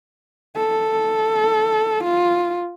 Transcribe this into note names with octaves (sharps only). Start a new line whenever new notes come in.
A4
F4